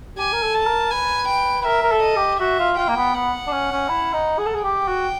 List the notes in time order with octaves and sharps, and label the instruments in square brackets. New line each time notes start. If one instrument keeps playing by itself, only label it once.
[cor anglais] G4 [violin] G#5
[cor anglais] A#4
A4
[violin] A5
[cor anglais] A#4
[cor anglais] B4 [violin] G#5
[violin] G5
[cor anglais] B4
[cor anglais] A#4 [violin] E5
[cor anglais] A#4
A4
[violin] D#5
[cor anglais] G4
[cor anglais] F#4 [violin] E5
[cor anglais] F4
[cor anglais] F4 [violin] G5
[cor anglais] A#3
B3
[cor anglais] B3 [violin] F#5
[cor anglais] D4
C#4
C#4
E4
D#4
G#4
A4
G#4
[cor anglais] G4 [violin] G5
[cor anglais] F#4